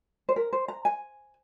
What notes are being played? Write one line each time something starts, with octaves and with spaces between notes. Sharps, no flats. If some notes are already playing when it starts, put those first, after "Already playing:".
C5
A#4
C5
A#5
G#5